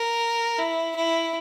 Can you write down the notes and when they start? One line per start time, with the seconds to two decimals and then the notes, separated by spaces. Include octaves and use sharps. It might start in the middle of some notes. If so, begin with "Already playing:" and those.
Already playing: A#4
0.59 E4
0.96 E4